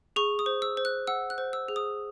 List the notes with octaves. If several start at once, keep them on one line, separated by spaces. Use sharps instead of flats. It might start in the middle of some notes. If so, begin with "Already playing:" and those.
G#4 C#6
D#6
C5
E6
C5
F#6
F#5 E6
F#6
C5
E6
G#4
D#6